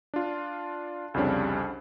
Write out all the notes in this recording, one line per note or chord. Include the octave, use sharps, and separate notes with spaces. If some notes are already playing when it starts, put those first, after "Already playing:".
D4 F4
C2 F2 C#3 G3 D4 C#5